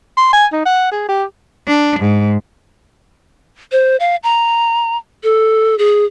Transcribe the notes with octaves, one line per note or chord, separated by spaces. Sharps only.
C6
G#5
D#4
F#5
G#4
G4
D4
G#2
C5
F5
A#5
A4
G#4